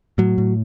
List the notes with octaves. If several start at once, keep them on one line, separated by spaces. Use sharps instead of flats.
A2 F#3
A2